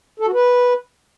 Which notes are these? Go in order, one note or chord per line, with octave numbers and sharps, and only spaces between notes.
A4
F#4
B4